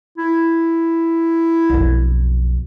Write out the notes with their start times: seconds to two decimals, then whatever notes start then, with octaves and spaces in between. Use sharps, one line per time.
0.18 E4
1.70 B1 F2